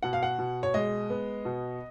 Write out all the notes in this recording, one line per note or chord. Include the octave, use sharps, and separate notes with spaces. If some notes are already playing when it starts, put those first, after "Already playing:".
B2 F#5
F5
F#5
B2
C#5
G#3 D#5
B3
B2